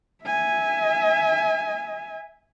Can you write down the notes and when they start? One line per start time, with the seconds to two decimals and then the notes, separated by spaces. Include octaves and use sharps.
0.24 E5 G#5